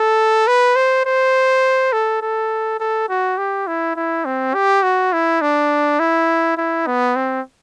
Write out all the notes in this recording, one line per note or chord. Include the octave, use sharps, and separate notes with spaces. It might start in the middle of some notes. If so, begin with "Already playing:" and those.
Already playing: A4
B4
C5
C5
A4
A4
A4
F#4
G4
E4
E4
C4
G4
F#4
E4
D4
E4
E4
B3
C4